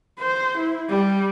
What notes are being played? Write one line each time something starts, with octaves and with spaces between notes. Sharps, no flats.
C5
E4
G3